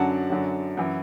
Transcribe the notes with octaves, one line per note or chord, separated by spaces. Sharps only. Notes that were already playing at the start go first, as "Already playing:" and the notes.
Already playing: F#2 D3 F#3 F#5 A5
F#2 D3 F#3
F#2 E3